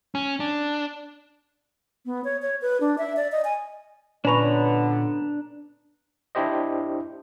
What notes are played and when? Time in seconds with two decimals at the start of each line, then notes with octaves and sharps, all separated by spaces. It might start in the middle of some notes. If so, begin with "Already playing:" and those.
0.15 C#4
0.40 D4
2.06 B3
2.24 C#5
2.42 C#5
2.62 B4
2.80 D4
2.98 E5
3.16 D5
3.32 D#5
3.44 G#5
4.25 A#2 D3 B3 C#4 D4 B4 C#5 A#5
6.35 D4 E4 G4 C5 D#5